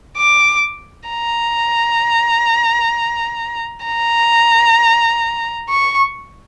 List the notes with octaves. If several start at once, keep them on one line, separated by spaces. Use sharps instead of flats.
D6
A#5
A#5
C#6